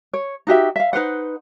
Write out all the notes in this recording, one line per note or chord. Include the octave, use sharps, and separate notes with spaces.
C#5
D#4 F#4 G4 E5
E5 F5
D#4 B4 C5 F#5